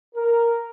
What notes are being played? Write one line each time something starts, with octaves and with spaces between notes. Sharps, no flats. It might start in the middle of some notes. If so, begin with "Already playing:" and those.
A#4